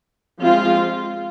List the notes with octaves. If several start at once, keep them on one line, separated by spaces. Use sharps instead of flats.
F3 G#3 C4 F4